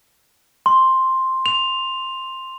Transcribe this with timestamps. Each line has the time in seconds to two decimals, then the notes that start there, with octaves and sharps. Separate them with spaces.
0.66 C6
1.46 F7